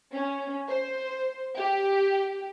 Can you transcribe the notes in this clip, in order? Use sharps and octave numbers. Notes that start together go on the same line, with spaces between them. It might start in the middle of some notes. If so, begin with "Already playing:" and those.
C#4
C5
G4